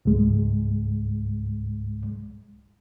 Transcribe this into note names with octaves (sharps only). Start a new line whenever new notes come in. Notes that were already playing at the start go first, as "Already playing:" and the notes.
C#2 G#2 G#3